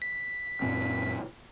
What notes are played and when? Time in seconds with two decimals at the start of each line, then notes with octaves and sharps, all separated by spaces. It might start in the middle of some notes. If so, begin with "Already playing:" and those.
0.02 B6
0.62 F#2 A#2 C4